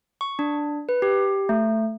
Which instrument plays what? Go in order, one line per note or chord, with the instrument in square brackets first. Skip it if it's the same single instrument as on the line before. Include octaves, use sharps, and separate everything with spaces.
[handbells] C#6
D4
B4
G4
A3